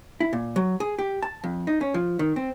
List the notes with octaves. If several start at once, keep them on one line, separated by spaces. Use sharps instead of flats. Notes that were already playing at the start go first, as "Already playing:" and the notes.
E4
A#2
F#3
G#4
G4
A5
F2
D#4
C#4
F3
D#3
C4